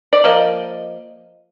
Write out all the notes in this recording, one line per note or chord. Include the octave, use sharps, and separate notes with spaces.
D5
F3 A#3 D#5